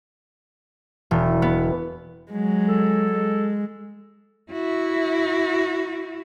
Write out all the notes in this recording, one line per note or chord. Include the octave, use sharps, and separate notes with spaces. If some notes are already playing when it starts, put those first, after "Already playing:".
E1
B3
F#3 G#3
A4
G#3
E4 F#4